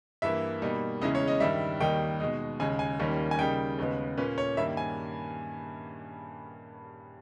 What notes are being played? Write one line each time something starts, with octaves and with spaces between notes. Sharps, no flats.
G2 E3 A#3 E5
B2 G3 A#3 D#4
E2 C#3 G#3 C#4 E4 D#5
C#5
D#5
G2 D#3 G3 E5
D#2 D#3 G3 A#3 D#4 G5
B2 G#3 D#4
D#2 C#3 G#3 G#5
G#5
D#2 D#3 G3 A#3 C#4
G#5
C#3 G3 A#3 D#4 G5
D#2 C#3 G#3 B3
A#2 A#3 C#4 B4
C#5
G2 D#3 G3 A#3 E5
G#5